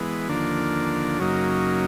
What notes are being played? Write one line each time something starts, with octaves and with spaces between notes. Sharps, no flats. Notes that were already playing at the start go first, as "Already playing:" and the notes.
Already playing: E3 G#3 B3
D#2 D3 F3 A#3 D4
F#2 C#3 F#3 A#3 D#4